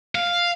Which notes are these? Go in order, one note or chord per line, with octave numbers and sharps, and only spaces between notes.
F5